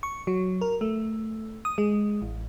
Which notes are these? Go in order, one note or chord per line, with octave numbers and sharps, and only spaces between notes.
C#6
F#3
A#4
A3
D#6
G#3
A1